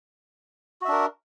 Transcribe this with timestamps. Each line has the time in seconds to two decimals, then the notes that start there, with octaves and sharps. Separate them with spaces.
0.82 F#4
0.85 E5
0.88 D4
0.92 A#4